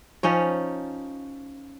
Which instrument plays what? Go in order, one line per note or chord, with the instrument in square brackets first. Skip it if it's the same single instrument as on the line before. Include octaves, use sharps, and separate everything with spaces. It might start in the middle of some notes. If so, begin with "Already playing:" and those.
[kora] F3 C#4 D#4 C#5